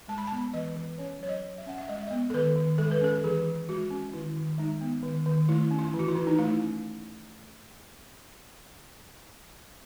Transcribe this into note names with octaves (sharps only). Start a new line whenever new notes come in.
G#3 A5
B5
B3 A5
E3 D#5
E3
C#4 C#5
F#3 C#5
D#5
F#3
E5
C#4 F#5
E5
G#3 D#5
E5
B3 D#5
A4
D#3 B4
D#3
G#3 A4
B4
C#4 A4
E3 G#4
E3
G#3 F#4
C#4
D#3 E4
D#3
G#3 D#4
B3
D#3
D#3
A3 E4
C#4
E4
E3
F#4
E4
E3
D#4
A3 E4
C#4